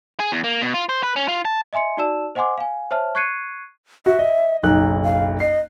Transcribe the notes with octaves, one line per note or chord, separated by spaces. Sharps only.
G#4
E2
A#3
B2
F4
C5
B4
C#4
F4
A5
D#5 E5 G#5 C6 C#7
D#4 F#4 D5 A5 E6 E7
C5 D#5 F#5 G#5 C6 D6
F5 G#5
C5 C#5 E5 A5 F6
C#6 F#6 G#6 C7 C#7 D#7
F#4 E5
D#5
F#1 B1 D#4 F#6
F5
D#5 C7